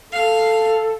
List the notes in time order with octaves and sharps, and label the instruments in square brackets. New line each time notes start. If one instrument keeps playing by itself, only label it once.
[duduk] A4 [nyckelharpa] F5